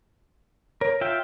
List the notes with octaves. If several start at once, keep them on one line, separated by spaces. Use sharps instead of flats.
A#4 C#5
F4 E5 G5